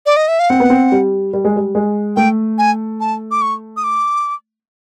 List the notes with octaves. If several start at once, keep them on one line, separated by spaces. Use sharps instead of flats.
D5
D#5
E5
F5
C4 F#5
B3
C4
G3
G3
G#3
G3
G#3
A3 G5
G#5
A5
D6
C#6
D#6
D6